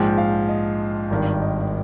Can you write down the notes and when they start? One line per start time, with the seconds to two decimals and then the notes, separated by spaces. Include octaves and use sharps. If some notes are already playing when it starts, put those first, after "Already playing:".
Already playing: A#1 G#2 F3 G5
0.18 F5
0.49 D#5
1.10 G#1 G2 D#3
1.42 D#5